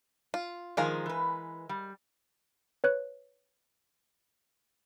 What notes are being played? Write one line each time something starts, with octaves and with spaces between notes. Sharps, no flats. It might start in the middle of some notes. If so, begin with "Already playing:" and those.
F4
D#3 F3 G#3 G#4 A#4 F5
E3 B4
G3
B4 C#5 F#6